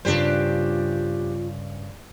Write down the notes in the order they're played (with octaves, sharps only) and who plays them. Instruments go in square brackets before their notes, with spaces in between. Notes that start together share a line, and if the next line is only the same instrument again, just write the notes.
[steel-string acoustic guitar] G2 C#3 [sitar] D4 G4 C5 [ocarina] F4